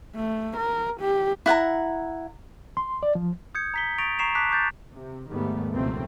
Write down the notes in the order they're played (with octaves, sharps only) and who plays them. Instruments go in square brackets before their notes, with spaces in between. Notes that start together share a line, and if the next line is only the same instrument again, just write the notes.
[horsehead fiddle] A3
A#4
G4
[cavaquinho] E4 F#5 G#5 A#5
[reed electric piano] C6
D5
F3
[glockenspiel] D#6 G6 G#6 C#7
A#5 B6 G7
C#6 D#6 A6 A#6 D7 F7
A#5 C#6 C7 E7 F7
A5 D6 F#6 B6
C#6 D6 G6 A6
[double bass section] C3
D#2 G#2 D#3 G3 A3 B3
F1 C#2 B2 A3 A#3 C4